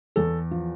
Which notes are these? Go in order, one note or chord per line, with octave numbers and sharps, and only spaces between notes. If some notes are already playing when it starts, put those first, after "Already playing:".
E2 A4
F3